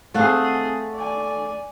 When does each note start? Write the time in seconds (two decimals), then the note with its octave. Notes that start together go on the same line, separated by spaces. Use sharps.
0.14 A3 C4 G#4 F5 F#5
0.95 D5 G#5